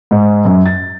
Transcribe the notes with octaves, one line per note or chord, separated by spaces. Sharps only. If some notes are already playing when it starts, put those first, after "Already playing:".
G#2
F#2
A6